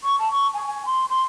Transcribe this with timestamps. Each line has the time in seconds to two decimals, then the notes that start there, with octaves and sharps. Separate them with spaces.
0.03 C#6
0.18 A5
0.30 C#6
0.53 G#5
0.67 G#5
0.85 C6
1.09 C6